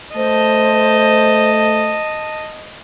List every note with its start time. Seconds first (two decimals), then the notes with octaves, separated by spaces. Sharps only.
0.16 A3 C5 D#5 A5